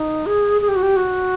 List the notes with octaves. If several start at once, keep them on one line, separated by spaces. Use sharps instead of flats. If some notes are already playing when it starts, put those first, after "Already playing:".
Already playing: D#4
G#4
G#4
G4
F#4
G4
F#4